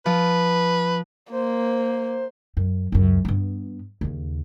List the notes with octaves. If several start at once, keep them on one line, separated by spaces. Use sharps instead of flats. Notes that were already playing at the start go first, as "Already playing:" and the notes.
F3 B4
A#3 C5
F#2
C#2 F#2
G2 B3
D#2 C#3